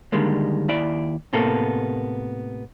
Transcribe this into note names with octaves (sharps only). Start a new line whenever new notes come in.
D3 D#3 G3 G#3 A#3
D#2 E4 D5
A2 C3 A#3 B3 A4